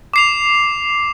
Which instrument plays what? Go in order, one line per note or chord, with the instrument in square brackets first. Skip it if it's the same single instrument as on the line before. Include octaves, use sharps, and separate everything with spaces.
[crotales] D6 C7 F7